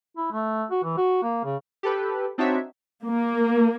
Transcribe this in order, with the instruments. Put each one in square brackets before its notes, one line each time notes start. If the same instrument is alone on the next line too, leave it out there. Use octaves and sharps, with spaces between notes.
[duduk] E4
A3
F#4
E3
F#4
A#3
C#3
[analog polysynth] G4 A4 B4
C4 D4 D#4 F#4 C#5 E5
[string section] A#3